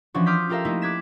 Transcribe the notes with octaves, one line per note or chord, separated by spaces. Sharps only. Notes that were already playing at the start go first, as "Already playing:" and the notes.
E3 F3 C#4 D4 F#4
C6 D6 D#6 F6 G6 B6
F4 G4 A4 A#4 E5 F5
A3 A#3 D#4 E4
D6 F#6 G#6 B6 E7